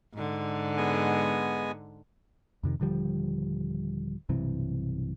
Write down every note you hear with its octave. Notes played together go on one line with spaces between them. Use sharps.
G#2 D3
G#3 B3 G#5
F2 C3 D#3
D#1 D3 F3 G3
B1 G2 C3 E3